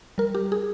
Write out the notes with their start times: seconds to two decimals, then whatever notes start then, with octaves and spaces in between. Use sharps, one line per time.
0.18 G3 A#4
0.35 G4
0.52 G#4